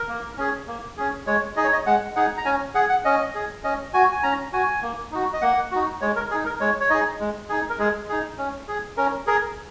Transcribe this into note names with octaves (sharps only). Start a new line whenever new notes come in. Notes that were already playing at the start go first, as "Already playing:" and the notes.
Already playing: A#4
A#3
C#4 G#4
A#3
C#4 G#4
G#3 C#5
D#4 G#4 D#5
C#5
D#5
G#3 F#5
D#4 G#4 F#5
A#5
C#4 G#5
G#4 F#5
F#5
C#4 D#5
G#4
C#4 D#5
F#4 G#5
G#5
C#4 A#5
F#4 G#5
A#3
D#4 F#4
D#5
A#3 F#5
D#4 F#4
G#3 C#5
A#4
G#4
D#4
A#4
G#3 C#5
C#5
D#4 G#4 D#5
G#3
D#4 G#4
A#4
G#3 G#4
D#4 G#4
C#4
G#4
C#4 A#4
G#4 A#4